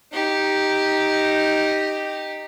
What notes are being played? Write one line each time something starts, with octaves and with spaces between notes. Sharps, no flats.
D#4 G4